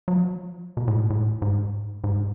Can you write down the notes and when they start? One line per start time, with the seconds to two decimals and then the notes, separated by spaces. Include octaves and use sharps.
0.08 F#3
0.17 F3
0.77 B2
0.88 A2
1.10 A2
1.42 G#2
2.04 G#2